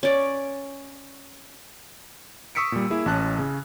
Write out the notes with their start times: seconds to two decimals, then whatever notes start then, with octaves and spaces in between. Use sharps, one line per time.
0.03 C#4 D5
2.55 C#6 D#6 E6 B6 C#7 D7
2.72 A#2 G3
2.90 A#3 E4 G#4
3.06 A1 C#4 A5 F#6
3.39 C#3 C#4